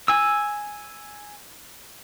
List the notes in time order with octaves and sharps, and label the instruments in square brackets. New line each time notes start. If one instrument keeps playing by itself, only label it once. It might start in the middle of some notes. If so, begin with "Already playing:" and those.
[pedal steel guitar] G#5 E6